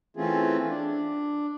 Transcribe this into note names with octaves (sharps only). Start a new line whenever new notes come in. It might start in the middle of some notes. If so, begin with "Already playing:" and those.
E3 A3 C4 C#4 F4 G#4
D4